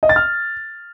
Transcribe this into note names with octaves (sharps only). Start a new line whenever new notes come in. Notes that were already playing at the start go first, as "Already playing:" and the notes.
D#5
A6
F6